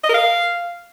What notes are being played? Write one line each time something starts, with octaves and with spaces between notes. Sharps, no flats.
D#5
A#4
F5